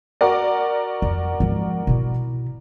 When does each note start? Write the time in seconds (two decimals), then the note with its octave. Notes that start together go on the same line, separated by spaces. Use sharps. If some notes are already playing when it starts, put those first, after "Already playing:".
0.21 F#4 A#4 D5
1.02 F2
1.40 G#2 F3
1.87 B2 E4